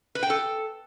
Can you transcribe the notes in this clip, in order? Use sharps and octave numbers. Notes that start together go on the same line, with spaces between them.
B4
G5
A4